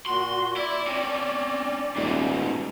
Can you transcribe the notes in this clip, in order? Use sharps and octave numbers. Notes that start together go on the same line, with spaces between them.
A#2 F#4 C6
E4 D5
C4 C#4
D#1 G#2 B2